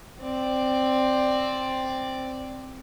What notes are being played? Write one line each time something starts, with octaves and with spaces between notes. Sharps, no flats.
C4 D5